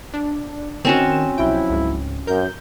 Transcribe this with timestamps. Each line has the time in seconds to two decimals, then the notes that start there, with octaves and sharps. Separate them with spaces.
0.14 D4
0.85 D#3 C4 C#4 F#4 E7
1.38 B1 F3 F#3 E4 G5
1.70 C#2 G#2
2.27 F#2 A#4 G6